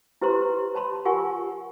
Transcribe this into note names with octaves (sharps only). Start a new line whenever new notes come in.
E4 G4 B4 C5 A#5 C6
C#5 A5 B5 C6
F4 G4 A#4 F#5 G#5 C#6